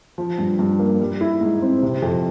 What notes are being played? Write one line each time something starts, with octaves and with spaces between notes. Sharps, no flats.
F3
G2
G2
A#3
G3
E4
G#2
C4
C3
F2